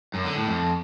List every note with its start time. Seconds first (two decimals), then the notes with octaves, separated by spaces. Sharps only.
0.14 F#2
0.25 D3
0.36 A2
0.47 F2